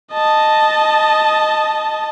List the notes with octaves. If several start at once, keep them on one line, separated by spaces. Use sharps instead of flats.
D#5 A5